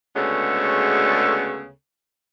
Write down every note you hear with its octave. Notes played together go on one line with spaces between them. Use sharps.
D2 C#3 G#3 B3 A4 C#5